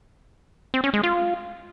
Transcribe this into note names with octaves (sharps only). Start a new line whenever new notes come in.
C4
C#4
G#3
F4